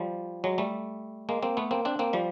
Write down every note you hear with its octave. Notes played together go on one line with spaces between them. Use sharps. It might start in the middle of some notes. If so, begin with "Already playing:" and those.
Already playing: F3 G3
F#3 G#3
G3 A3
G#3 A#3
A#3 C4
A3 B3
A#3 C4
C4 D4
A#3 C4
F3 G3